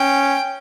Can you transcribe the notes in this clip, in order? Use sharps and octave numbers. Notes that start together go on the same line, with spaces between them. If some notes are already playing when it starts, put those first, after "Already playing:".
Already playing: C#4 G5